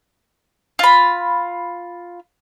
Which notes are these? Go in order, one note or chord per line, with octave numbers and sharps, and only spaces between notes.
F4 B5